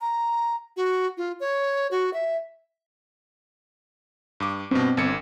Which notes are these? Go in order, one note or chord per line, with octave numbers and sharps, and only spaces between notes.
A#5
F#4
F4
C#5
F#4
E5
G2 D6
G2 B2 B3 C4
G1 G#6 C#7